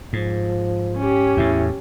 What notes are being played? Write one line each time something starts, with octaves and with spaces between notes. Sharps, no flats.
G#2 F3
C#4 G4
E2 A2 E4